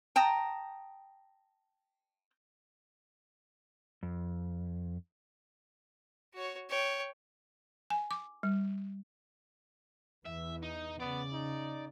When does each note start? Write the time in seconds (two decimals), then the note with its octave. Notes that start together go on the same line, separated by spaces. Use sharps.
0.16 G5 A5 A#5 D#6
4.03 F2
6.34 F#4 C#5
6.69 C#5 G5
7.90 G#5
8.11 D6
8.43 G3
10.26 E2 E3 E5
10.63 D#4
11.00 C#3 B3 D5
11.33 D#4